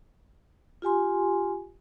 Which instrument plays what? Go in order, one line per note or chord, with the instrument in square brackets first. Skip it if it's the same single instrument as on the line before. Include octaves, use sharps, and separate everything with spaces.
[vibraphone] F4 G4 G#5 C6